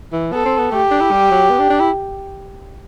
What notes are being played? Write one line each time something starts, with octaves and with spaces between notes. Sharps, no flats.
E3
B3 A4
C4
B3
A3 G4
D4
E4
G3
F#3
B3
D4
D4
E4